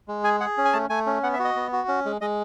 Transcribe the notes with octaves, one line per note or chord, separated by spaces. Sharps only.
G#3
G#4 G#5
G#4 F#5
C#4
G#5
A3 A5
A3 G#5
C#4
B3 F#5
E5
F#4
D#5
B3
F#4
C#4
G#3
G#3 D#5